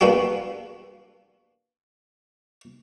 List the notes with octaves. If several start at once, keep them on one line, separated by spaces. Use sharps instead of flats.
A#3 B3 D4 F#4 G4